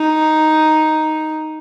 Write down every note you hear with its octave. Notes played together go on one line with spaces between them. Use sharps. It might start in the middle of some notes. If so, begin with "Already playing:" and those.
Already playing: D#4